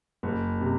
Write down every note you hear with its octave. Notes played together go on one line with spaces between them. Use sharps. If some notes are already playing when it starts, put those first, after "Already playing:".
F#1
C3